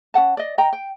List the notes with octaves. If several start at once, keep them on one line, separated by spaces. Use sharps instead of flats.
C#4 A#4 F#5 A5
D5 D#5
D#5 G5 A#5
G5